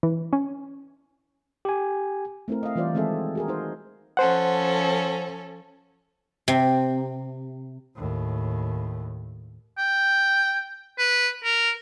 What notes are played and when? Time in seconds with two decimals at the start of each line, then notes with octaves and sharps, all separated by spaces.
0.03 E3
0.33 C#4
1.65 G4 G#5
2.48 A3 C4 E4 A#4
2.63 D#5 F5
2.75 E3 G3 F4 C5 D5
2.94 D#3 G#3 C4 G#4 A4 E5
3.35 F#4 G#4 A#4
3.48 D#4 C5
4.17 F3 C#4 A4 C5 F#5
6.48 C3
7.95 D#2 A2
9.78 G5
10.99 B4
11.44 A#4